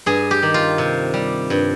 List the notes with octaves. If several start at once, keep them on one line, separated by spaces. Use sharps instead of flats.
G2 G#4
G4
D#3
F4
C3
G3
G2